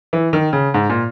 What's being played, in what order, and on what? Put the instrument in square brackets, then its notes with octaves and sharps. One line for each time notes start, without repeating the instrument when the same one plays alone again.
[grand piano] E3
D#3
C#3
G#2
A#2